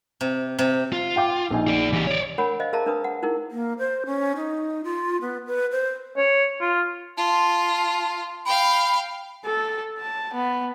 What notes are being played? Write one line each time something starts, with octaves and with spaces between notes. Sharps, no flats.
C3
C3
F4
F5 G5 D6
A#1 D#4 G#5
G#4 D5
E3 G4
C#5 D5
D4 A#4 C#5 F#5 B5
C5 D#5 F5
G#4 A#4 E5 F5 A5 A#5
D4 A#4 B4 D#6
F#5
D#4 E4 G#4 A#4
A#3
C5
C#4
D#4
F4
B3
B4
C5
C#5
F4
F4 A5
F5 G5 B5
A4
A5
B3